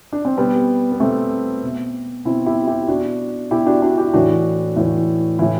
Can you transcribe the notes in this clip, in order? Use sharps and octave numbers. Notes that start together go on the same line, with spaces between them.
D4
C4
B2 G3 B3
B3
B2 A3 C4
B2
B2 C4 E4
E4 G4
E4 G4
B2 D4 F#4
B2 E4 G4
D4 F#4
D4 F#4
E4 G4
A2 E3 D4 F#4
A2 E3
A2 E3 E4 G4